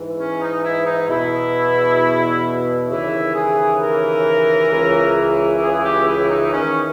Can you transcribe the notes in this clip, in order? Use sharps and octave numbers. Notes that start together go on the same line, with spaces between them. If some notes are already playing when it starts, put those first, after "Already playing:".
Already playing: G#2 E3
C#4
D#4
E4
D#4
E2 B2 E4
D#2 C#3 E3 E4
G#4
A#4
C#2 C#3 E3
G#4
G4
E4
D#4
E2 D#3 C#4